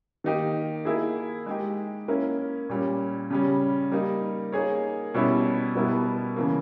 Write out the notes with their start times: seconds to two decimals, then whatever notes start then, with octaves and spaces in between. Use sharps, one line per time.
0.24 D#3 A#3 D#4 G4
0.85 A#3 E4 G#4
1.46 G#3 D#4 G4
2.08 A#3 C#4 E4 A#4
2.69 A#2 G3 C#4
3.30 C#3 G3 C#4
3.91 G3 A#3 D#4
4.52 A#3 D#4 G#4 C#5
5.14 B2 G3 C#4 E4
5.75 B2 G3 B3 E4 A#4
6.36 C#3 E3 A#3